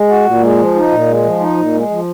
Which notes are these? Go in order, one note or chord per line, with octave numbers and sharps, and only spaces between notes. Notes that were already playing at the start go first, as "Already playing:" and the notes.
Already playing: G#3
F#4
A#2
G#3
F3
D#4
A#2
G#3
F3
D#4
A#2
G#3
F3